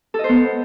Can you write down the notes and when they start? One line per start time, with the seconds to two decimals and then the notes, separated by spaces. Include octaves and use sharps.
0.14 A4
0.19 D#5
0.24 C5
0.29 B3